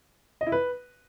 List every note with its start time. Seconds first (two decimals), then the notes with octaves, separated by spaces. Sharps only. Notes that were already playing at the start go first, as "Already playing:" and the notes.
0.41 D#5
0.47 E4
0.52 B4